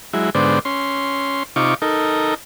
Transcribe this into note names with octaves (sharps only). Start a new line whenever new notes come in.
F#3 G#3 E4
G#2 D3 B3 C5 D5
C#4 C6
C3 D#4 F4 C#6 D6
D#4 A4 A#4